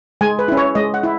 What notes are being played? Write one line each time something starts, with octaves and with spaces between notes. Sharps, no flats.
G#3 G#5
B4
C#4 E4
C#5
G#3 D#5
F#5
E4